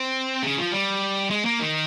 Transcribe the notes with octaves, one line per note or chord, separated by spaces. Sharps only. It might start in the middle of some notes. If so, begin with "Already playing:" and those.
Already playing: C4
C#3
F3
G3
G#3
A#3
D#3